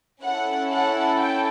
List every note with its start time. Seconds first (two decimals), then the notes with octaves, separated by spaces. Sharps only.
0.24 C#4 E4 A4 F#5
0.71 F#5
1.19 G5